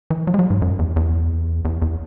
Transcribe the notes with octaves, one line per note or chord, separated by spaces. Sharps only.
E3
F#3
G#3
F#3
G#2
F#2
E2
E2
E2
E2